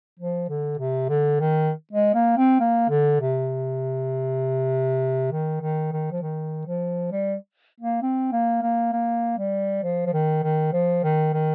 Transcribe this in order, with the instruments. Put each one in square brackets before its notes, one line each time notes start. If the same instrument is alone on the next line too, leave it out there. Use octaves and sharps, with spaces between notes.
[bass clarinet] F3
D3
C3
D3
D#3
G#3
A#3
C4
A#3
D3
C3
D#3
D#3
D#3
F3
D#3
F3
G3
A#3
C4
A#3
A#3
A#3
G3
F3
F3
D#3
D#3
F3
D#3
D#3